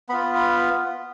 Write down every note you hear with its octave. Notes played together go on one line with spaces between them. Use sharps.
B3 F4 B5
B5